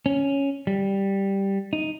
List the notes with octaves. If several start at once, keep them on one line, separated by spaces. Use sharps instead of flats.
C#4
G3
D#4